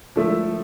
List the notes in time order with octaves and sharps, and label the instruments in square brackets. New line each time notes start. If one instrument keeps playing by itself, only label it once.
[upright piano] D3 F3 A3 E4